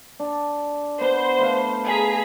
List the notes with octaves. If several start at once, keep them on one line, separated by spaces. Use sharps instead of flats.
D4
B3 C5 F#5
A3 B4 F5
G#4 A#5 B6